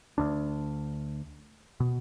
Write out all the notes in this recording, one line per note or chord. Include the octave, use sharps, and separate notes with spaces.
D2 D4
B2